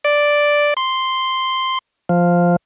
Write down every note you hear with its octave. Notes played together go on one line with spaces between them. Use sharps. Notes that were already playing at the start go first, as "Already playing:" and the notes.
D5
C6
F3